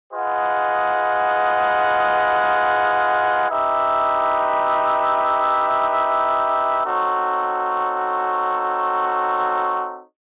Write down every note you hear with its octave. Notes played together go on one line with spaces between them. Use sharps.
F4 G#4 B4 D#5 F#5
D#4 G4 B4 E5
C4 D#4 F#4 A4 C#5